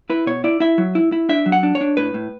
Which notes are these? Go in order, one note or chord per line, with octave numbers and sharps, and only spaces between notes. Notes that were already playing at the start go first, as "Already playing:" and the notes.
E4 B4
B2 C#5
E4 D5
E4 E5
F#3
E4
E4
D4 E5
F#3
F#5
D4
C#5
D4
A2 B4
A2